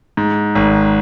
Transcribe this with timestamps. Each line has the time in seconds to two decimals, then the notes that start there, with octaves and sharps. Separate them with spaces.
0.17 G#2
0.55 G#1